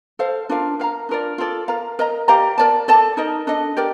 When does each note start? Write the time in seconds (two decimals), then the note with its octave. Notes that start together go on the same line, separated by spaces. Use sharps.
0.19 A4 C5 F5
0.49 D4 F4 A#4 F5
0.80 A#4 F5 A#5
1.09 D4 F4 A#4 D5
1.38 F4 A4 D5
1.68 A#4 F5 A#5
1.99 A#4 D#5 A#5
2.28 G4 D5 F5 A#5
2.58 A#4 D5 A5
2.88 A4 D5 A5
3.17 D#4 A#4 D#5
3.47 D4 A4 D#5
3.77 G4 A#4 D5